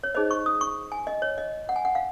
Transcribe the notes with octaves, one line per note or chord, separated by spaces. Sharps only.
C#5
D#4 G#4 C5 D#5
C#6
D#6
C#6
G#5
D#5
C#5
D#5
F#5
G#5
F#5
F5